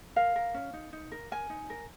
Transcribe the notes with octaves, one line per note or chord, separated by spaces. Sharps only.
A#4 F5
A#4
C#4
D#4
D#4
A#4
A#4 G#5
D#4
A#4